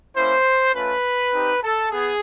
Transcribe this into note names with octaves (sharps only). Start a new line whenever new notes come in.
A#3 C#4 E4 C5
A3 C#4 F4 B4
C4 D#4 G4
A4
B3 G#4